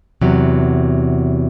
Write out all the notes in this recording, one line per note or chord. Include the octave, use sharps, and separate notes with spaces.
E2 C3 F#3